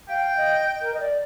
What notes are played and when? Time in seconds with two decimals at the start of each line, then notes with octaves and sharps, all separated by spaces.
0.09 F5 G5
0.37 D#5
0.81 A#4
0.93 D#5
1.00 D5